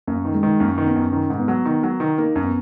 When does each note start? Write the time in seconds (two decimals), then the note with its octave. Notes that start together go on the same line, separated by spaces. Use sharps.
0.07 F#2 A#3
0.25 D#3
0.34 G#3
0.43 D#3
0.49 G#3
0.60 F#2 A#3
0.78 D#3
0.87 B3
0.96 F#2
1.13 D#3 C#4
1.30 G#2
1.40 B3
1.48 F#3
1.65 D#3
1.83 F#3
2.00 D#3
2.18 A#3 D#4
2.36 F#2
2.44 B3